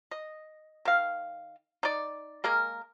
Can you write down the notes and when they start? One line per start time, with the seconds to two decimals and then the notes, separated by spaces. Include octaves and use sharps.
0.11 D#5
0.85 D#3 F5
1.83 D#4 D5
2.44 G#3 A#3 G#4 A#4